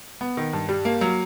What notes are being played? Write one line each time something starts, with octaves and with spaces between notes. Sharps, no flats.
B3
D#3
G2
G3
A#3
F#3